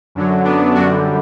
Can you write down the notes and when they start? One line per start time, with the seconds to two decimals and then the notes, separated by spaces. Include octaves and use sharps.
0.15 F#2 D3 F#3
0.45 B3 D4
0.75 F#2 D3 G3 D4 F#4